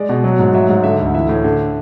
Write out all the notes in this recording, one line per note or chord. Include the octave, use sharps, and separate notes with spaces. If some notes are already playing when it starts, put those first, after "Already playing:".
Already playing: G#3 D5
B2
F#3
G#2
F#3 E5
G#2
D3 E5
D2
E3 E5
A2
D3